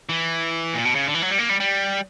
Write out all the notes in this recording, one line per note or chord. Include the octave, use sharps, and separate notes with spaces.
E3
A#2
B2
C#3
D3
E3
F#3
G3
A#3
G3
G3